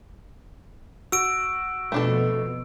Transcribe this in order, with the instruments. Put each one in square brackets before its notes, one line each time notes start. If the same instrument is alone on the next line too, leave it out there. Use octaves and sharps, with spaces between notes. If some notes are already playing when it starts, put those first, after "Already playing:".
[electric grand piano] F#4 [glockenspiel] E6 D7
[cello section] F2 B2 [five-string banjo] A3 D4 A4